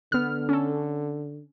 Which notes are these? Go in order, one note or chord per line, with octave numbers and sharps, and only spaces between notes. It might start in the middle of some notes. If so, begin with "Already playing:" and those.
D3 B3 F6
C#4 A4